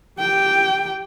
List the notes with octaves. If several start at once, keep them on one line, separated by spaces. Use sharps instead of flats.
G4 G5